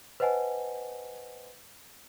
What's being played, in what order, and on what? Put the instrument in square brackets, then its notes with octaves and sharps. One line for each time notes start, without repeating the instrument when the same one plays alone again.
[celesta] B4 C5 D#5 F#5 G#5 A5